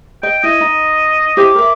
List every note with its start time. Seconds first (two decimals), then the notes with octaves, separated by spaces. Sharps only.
0.23 D#5 G5
0.43 E4 D#5
0.61 D#4
1.37 E4 G4 C5 D6
1.55 A#4 E5